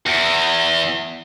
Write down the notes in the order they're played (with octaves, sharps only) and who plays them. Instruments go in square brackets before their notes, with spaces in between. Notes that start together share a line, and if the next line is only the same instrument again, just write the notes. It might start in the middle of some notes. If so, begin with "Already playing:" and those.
[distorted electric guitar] E2